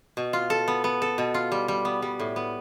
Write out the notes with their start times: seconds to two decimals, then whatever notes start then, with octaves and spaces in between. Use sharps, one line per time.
0.17 B2
0.33 F4
0.50 A4
0.68 B3
0.84 B3
1.02 A4
1.18 B2
1.34 F4
1.52 G3
1.68 G3
1.85 B3
2.02 G3
2.19 A2
2.36 B3